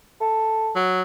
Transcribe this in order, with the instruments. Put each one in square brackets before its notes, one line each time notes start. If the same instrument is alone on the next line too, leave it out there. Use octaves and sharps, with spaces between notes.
[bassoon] A4
[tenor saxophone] F#3